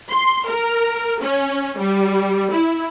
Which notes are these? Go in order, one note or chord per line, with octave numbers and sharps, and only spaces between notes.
C6
A#4
C#4
G3
E4